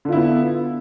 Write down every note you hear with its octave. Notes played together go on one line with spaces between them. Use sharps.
D3 B3 E4 F4